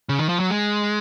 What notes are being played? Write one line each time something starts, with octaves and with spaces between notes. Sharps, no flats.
C#3
D#3
F3
F#3
G#3